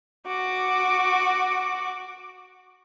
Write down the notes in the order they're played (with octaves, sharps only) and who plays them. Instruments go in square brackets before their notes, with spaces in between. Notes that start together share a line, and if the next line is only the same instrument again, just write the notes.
[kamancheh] F#4 D6